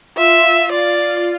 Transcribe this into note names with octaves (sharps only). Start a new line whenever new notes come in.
F4 E5
D5